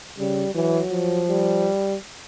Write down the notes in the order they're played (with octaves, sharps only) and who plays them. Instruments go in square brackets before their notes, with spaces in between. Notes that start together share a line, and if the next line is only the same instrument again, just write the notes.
[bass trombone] C#3 [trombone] G3
[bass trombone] E3 [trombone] F#3
[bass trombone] F3
[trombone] G3